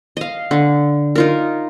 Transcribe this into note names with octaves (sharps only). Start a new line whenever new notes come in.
D#5 F5
D3
D#4 F4 A#4